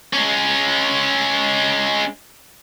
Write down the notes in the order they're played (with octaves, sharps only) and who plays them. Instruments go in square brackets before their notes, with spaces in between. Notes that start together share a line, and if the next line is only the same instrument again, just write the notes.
[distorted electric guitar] G#3 C#4